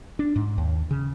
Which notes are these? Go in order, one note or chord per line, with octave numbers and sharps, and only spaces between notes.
D4
G#2
D#2
C#3